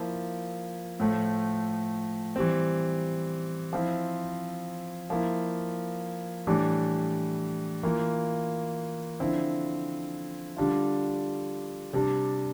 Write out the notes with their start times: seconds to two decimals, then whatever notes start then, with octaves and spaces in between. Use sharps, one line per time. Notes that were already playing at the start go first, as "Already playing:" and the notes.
Already playing: F3 A#3 E4
1.00 A2 F3 A3
2.36 E3 G3 C4
3.73 F3 C4 E4
5.10 F3 A#3 E4
6.47 A2 E3 G3 D4
7.83 E3 A#3 F4
9.20 D3 F3 C4 E4
10.57 D3 G3 D4 F4
11.93 C3 G3 D4